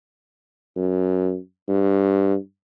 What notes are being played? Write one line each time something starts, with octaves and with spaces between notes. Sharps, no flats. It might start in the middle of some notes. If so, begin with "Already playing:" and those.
F#2
G2